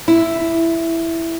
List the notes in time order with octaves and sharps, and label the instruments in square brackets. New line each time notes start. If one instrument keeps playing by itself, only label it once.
[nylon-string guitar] E4